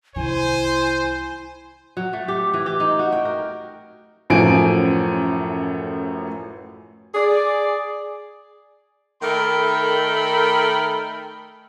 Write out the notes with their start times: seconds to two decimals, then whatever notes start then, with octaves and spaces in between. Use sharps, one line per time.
0.16 C2 D#3 E4 C5 G#5
1.97 F#3
2.13 A3
2.28 G4
2.54 E3
2.66 G4
2.80 D#4
2.99 F#4
3.12 G5
3.25 A#4
4.30 A1 F#2 A2 F3 G#5 D7
7.15 G#4 D5
9.22 D#3 A3 A4 A#4 G5 B5